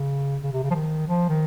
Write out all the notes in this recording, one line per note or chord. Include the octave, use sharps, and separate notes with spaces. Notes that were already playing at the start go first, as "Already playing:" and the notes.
Already playing: C#3
C#3
C3
C#3
F3
D#3
F3
D#3